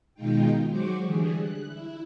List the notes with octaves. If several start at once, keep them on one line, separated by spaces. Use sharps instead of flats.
B2 D#3 G#3 D#4 F4 G5
F#3 G#3 F#4 C5 C#6 D6
D3 E3 G3 G#4
F#6
E4